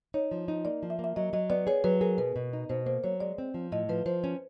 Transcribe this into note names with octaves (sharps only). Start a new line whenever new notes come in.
D#4 C#5
F3
D#4
A#3 D5
F3
E5
A#3
E5
F#3 D#5
F#3 D#5
B3 D5
G#4 C#5
F#3 B4
G#4 A#4
B2 B4
B2
D#4
B2 C5
A#3 C5
F#3 C#5
G#3 D5
C4
F3
A2 D#5
F3 B4
F3 C5
C#4